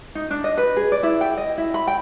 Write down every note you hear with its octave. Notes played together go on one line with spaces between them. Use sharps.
D#4
D4
D#5
B4
G#4
D5
E4
G5
D#5
E4
B5
G5